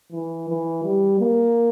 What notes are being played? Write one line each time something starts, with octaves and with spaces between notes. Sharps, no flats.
E3
E3
G3
A#3